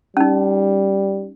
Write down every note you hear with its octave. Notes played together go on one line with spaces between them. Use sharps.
G3 C#4 D#4